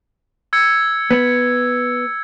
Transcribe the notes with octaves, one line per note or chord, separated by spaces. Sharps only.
E6 G#6 C#7
B3